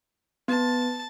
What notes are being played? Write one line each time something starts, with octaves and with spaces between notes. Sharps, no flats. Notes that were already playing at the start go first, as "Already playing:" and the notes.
B3 A5